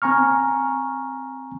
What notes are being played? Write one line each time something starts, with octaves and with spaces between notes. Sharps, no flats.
C4 G#5 A#5 C#6 F6